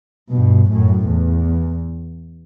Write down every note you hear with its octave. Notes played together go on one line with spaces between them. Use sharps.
G2 B2
F#2 A2
E2